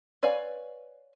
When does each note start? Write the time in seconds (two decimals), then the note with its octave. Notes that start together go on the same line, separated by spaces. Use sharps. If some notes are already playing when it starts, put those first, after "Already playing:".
0.23 B4 C#5 D5 F5 G#5